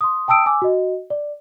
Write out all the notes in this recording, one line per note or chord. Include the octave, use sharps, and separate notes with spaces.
C6 D#6
G5 A5 D#6 E6 D7
G#5 D6 E6
F#4 D#5
D5